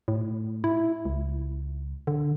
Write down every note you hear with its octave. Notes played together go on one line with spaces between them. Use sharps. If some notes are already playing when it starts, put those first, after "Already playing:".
A2
E4
C#2
D3